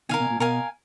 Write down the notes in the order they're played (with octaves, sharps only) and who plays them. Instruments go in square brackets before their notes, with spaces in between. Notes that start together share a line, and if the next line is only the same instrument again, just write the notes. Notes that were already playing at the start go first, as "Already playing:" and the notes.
[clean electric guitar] B2 D#3 [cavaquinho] A#4 F5 G#5
[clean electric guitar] B2
A#2
[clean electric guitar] B2 [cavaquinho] A#4 F5 G#5